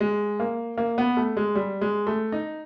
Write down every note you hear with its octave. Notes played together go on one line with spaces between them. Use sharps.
G#3
A#3
A#3
B3
A3
G#3
G3
G#3
A3
D#4